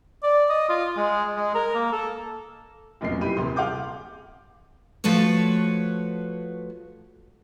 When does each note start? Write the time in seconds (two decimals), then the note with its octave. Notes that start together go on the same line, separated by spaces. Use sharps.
0.23 D5
0.49 D#5
0.69 F4
0.97 G#3
1.36 G#3
1.55 A#4
1.75 A#3
1.92 A4
3.01 F1 B1 F#2 A#2 C7
3.21 E4 G4 B5 D#7
3.37 D#1 C3 C6
3.56 G#4 F5 F#5 D6 G6
5.04 F3 A3 F#4 B4 C#5